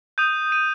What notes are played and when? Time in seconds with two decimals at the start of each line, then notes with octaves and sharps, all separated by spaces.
0.18 D#6 G6 D#7
0.52 D#7